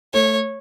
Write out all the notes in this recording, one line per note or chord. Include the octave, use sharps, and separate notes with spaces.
A3 C#5